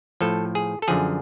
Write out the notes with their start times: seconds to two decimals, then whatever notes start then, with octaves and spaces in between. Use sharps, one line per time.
0.21 A2 F3 A4
0.55 G#4
0.82 A4
0.88 F#2 D3 F3 G#4